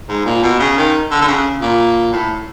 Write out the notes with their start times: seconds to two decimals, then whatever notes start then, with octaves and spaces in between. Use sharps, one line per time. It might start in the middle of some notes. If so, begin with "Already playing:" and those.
0.09 G#2
0.25 A#2
0.42 B2
0.59 C#3
0.77 D#3
1.11 D3
1.21 D3
1.27 C#3
1.61 A#2
2.12 A2